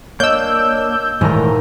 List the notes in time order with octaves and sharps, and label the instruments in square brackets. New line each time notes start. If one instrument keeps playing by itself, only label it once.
[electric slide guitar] A#3 D4 [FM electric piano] C#5 D#5 [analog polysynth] E6 G6
[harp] D#1 A#4 A#5 [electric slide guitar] G#2 E3 A3